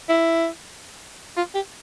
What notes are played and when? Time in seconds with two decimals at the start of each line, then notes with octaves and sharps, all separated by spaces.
0.09 E4
1.37 F4
1.55 G4